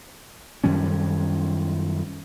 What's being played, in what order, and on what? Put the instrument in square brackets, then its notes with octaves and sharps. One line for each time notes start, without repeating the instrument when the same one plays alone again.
[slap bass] F#2 D#3 G3 C#4